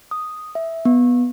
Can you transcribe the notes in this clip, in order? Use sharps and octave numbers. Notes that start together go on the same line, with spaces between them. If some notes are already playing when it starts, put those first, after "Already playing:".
D#6
E5
B3